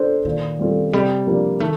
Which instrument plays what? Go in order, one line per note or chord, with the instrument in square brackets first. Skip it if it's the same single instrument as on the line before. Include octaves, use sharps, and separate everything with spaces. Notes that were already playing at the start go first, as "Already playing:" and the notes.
Already playing: [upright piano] D4 A4 C5
[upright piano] A#2 [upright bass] D#3
[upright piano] G3 C4 F4 A4
[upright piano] C3 [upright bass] G3
[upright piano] F3 A#3 D4 G4
[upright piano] D#3 [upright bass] A3